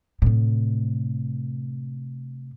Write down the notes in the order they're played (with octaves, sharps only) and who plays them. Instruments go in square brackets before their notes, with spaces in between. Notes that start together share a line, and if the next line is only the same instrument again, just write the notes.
[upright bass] A2 C3